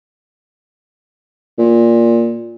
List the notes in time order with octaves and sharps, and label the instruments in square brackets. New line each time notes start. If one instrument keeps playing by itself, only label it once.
[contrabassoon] A#2